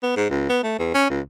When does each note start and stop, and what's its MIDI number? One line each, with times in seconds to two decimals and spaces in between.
0.02 0.16 59
0.16 0.29 44
0.30 0.47 37
0.49 0.61 59
0.63 0.77 57
0.79 0.91 40
0.94 1.10 61
1.10 1.21 37